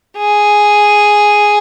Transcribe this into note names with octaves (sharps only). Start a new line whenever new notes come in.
G#4